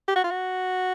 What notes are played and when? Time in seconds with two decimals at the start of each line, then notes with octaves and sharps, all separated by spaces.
0.08 G4
0.16 F#4
0.24 F4
0.31 F#4